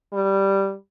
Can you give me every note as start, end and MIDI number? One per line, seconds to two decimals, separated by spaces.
0.13 0.74 55